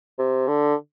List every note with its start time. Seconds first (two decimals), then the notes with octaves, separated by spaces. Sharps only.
0.18 C3
0.48 D3